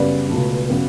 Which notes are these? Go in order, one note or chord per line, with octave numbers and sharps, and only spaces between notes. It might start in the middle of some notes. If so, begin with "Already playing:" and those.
Already playing: F#2 C#3 G3 B3 B4 D5
C#2 B2 A3
C#3 F#3 B3